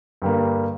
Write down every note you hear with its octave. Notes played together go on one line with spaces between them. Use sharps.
G2 D3 G3 A#3